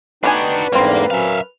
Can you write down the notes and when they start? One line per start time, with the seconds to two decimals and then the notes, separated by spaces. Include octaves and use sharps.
0.24 B3 D4 D#4 F#4 G4 B4 G5 G#5
0.72 E2 G#2 D3 G3 A#3 C4
1.11 F#3 C#4 A#4 E5 F5